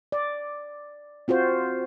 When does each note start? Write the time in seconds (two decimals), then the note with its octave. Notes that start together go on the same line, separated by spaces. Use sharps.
0.12 D5
1.28 C4 F4 F#4 C5